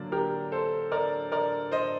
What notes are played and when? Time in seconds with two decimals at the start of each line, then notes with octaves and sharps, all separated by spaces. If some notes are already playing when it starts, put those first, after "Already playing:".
Already playing: D3 F#3 A#3 D4 D5
0.12 G4 A#4
0.52 A4 C5
0.92 A#4 D5
1.32 A#4 D5
1.72 C5 D#5